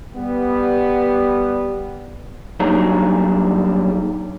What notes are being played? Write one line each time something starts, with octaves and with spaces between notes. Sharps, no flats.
G3 B3
F#3 G3 A#3 D4 D#4 G#4